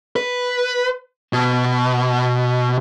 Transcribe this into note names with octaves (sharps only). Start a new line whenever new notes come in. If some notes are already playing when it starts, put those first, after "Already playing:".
B4
B2